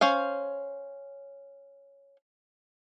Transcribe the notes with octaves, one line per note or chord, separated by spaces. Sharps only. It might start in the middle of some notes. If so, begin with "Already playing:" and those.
C#4 C5 F5